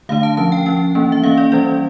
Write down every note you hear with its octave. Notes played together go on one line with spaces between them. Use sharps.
D3 A3 D4 F5
A5
F3 C#4 A5
G5
F3 C#4 G5
E3 A#3 C#4
E5
E3 A#3 C#4 F5
D5
E3 G3 C#4 D5